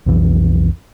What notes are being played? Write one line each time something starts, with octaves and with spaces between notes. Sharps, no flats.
B1 F2 E3